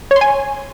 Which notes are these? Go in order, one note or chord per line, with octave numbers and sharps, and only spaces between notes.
C#5
C6
G#5